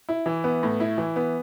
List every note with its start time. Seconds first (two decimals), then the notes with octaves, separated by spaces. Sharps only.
0.09 E4
0.26 E3
0.44 B3
0.63 A2
0.80 E4
0.98 E3
1.16 B3